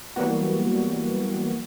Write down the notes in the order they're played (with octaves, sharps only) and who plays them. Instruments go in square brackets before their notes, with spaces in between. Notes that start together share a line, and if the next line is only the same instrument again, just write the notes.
[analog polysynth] E3 F#3 G3 A#3 B3 F#4